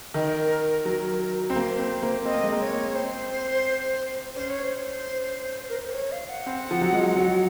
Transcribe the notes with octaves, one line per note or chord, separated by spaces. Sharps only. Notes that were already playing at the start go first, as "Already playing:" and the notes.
D#3 A#4
F#3
C4
A#3 C5
C4
A#3
C4 D#5
A#3
G#3
A#3
C#5
C4 C5
C#4 C5
C#5
C5
A#4
C5
C#5
F5
F#5
C4
F3
F#3
G#3
F#3